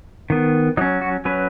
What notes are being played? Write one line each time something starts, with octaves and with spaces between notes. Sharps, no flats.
D#3 B3
F#3 C#4 D#4
F#4
F#3 C#4 B4